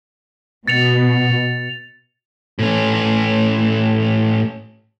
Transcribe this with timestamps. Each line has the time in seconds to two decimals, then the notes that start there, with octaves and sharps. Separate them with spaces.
0.68 B2 A6 C#7 F7
2.59 A2 C#4